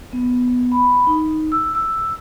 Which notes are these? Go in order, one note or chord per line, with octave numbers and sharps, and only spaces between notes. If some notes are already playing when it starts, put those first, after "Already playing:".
B3
B5
D#4
E6
E6